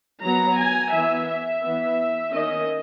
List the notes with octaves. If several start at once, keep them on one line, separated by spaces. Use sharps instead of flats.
F#3 B3 A#5
G#5
E3 B3 E5
E5
E3 B3
D#3 A#3 C#4 D#5